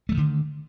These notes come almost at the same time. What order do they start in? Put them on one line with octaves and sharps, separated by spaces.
A3 F#3 D#3 D3